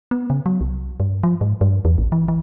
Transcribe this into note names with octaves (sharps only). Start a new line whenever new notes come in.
B3
C#3
F#3
C2
G2
F3
G#2
G2
E2
A1
E3
E3